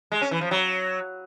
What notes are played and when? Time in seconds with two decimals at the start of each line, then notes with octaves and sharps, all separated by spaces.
0.12 G#3
0.21 C#4
0.31 E3
0.41 F3
0.51 F#3